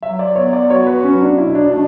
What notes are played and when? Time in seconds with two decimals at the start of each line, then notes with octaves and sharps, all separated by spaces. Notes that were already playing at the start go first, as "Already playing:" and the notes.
0.02 F#3 E5
0.19 D5
0.35 B3 C#5
0.53 D5
0.70 F#4 C#5
0.87 B4
1.03 F#3 C#4
1.21 D4
1.38 B2 E4
1.55 D4
1.72 A3 D4